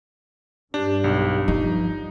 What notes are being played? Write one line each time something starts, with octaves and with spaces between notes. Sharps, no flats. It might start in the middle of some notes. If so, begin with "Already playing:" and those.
G2 D4 G4
B1
F3 D#4